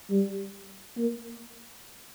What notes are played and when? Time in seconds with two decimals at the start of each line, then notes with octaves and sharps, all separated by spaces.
0.10 G3
0.98 A#3